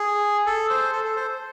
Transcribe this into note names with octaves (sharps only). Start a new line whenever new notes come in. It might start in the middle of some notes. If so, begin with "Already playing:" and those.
Already playing: G#4
A4
C5
A4
A4
C5